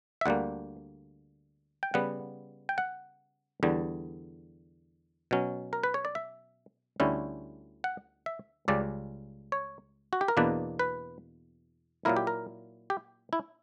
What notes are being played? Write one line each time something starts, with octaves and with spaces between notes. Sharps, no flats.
E5
D2 D3 G3 A#3 F#5
G5
C#3 G3 B3 F#5
G5
F#5
E2 D3 G3
B2 F#3 C#4
A#4
B4
C#5
D5
E5
D2 D3 G3 C#4 E4
F#5
E5
C#2 C#3 G3 D5
C#5
F#4
G4
A#4
E2 B2 A#3 D4 B4
B4
A#2 F#3 A#3 E4 A#4
G4
A#4
G4
E4